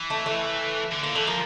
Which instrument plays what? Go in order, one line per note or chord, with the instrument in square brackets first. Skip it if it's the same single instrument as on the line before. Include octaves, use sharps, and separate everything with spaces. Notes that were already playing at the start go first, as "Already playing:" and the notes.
Already playing: [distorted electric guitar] E3
[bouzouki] A3
A3
[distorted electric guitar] D3
[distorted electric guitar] D3 [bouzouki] A#3
[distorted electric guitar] E3 [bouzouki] A3
[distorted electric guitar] F3 [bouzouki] A#3